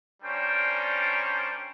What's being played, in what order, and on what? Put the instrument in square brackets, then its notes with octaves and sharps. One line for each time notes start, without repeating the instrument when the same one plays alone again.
[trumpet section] G3 C#4 D4 A#4 C5 G5